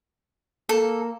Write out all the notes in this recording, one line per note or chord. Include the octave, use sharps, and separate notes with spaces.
A#3 A4